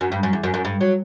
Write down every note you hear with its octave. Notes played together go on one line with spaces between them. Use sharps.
F#2
G2
F#2
E2
F#2
F#2
G2
F#3